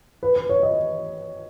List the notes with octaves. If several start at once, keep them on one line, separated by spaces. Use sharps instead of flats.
B4
B4
C#5
D#5